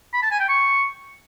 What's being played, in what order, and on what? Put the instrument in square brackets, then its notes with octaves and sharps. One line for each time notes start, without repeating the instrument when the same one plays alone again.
[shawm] B5
A5
G#5
G5
C#6